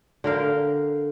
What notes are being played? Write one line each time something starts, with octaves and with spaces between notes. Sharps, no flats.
D3 A#4 F5 G5